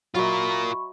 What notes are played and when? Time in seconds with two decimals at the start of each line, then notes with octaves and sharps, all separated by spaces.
0.15 F#3 F4 A#4 D#5 E5 B5 C#6